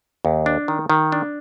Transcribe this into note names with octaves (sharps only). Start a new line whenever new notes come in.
D#2
D4
D#3
D#3
D4